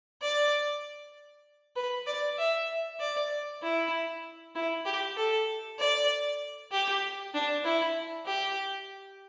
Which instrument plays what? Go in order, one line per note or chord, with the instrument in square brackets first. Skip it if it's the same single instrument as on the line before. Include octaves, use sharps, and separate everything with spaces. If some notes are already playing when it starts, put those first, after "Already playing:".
[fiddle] D5
B4
D5
E5
D5
E4
E4
G4
A4
D5
G4
D4
E4
G4